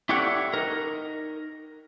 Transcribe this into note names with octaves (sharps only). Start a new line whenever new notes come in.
E4 G4 A4 C#5 D5 F#5
D#4 A#4